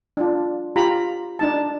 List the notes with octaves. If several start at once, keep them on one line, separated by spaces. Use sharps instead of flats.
D4 F4
F4 G4 A#5 B5
D4 D#4 A5